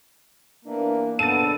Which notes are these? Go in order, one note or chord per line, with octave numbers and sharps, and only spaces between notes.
E3 A#3 B3 D4
F2 C#3 B3 D4 A4 A6 D#7